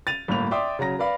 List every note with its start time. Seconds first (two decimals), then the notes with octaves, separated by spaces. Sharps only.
0.07 A6 D#7 F7
0.28 G1 A2 A#3 F7
0.51 D5 E5 G5 C6 D6 D#6
0.79 C#3 F#3 A#5 A#6
0.99 B4 D5 F5 B5